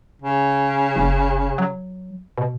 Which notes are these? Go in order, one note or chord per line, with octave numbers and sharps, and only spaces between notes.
C#3
F#1
F#3
B2